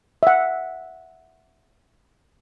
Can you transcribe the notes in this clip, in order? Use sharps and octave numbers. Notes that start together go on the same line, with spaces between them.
E5 F#5